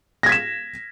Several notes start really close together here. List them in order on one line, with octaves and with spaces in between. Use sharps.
A#6 G#6 B6 E7